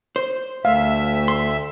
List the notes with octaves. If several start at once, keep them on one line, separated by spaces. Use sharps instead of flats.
C5
D2 A3 E5 F5
C6